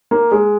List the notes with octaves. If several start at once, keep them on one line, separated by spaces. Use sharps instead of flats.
A#3
G#3